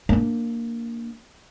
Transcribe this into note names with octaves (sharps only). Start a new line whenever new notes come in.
A#3 D4